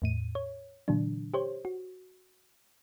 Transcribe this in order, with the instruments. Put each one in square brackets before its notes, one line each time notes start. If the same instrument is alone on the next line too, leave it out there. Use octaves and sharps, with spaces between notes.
[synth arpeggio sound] E2 A2 D#7
C#5
A#2 D3 E3 F#3 D4
G4 C5 C#5
F#4